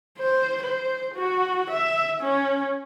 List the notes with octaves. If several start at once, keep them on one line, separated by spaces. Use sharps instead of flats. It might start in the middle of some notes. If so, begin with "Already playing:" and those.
C5
C5
F#4
E5
C#4